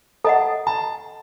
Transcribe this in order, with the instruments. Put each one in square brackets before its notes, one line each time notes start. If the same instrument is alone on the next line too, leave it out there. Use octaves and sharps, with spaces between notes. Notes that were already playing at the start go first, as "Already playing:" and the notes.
[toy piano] A4 D#5 F#5 [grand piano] A5
[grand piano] A5